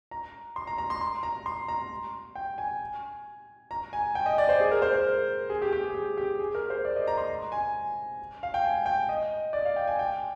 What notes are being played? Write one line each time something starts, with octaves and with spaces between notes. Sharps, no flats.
A#5
C6
A#5
A#5
C6
C6
A#5
C6
A#5
G5
G#5
A#5
G#5
G5
D#5
D5
C5
G#4
A#4
C5
A#4
G#4
G4
G4
G#4
G4
G4
G#4
A#4
C5
D5
D#5
A#5
C6
A#5
G#5
F5
G5
G#5
G5
D#5
D5
F5
G5
G#5
G5